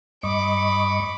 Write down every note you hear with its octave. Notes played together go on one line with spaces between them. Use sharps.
G2 D#5 B5 C#6 D6